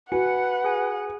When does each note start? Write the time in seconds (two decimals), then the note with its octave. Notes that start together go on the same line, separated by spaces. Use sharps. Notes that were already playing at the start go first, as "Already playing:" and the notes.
0.12 F#4 B4 F#5 G#5 C#7
0.64 G#4 G#5